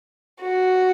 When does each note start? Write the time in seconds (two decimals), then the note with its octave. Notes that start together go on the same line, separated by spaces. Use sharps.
0.42 F#4